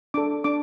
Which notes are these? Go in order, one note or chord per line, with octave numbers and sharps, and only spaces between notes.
D4 A4 D6
D4 D6